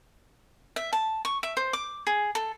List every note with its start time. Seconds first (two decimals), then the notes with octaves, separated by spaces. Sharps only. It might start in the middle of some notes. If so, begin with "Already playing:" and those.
0.76 E5
0.93 A5
1.25 C#6
1.43 E5
1.57 C5
1.73 D6
2.07 G#4
2.35 A4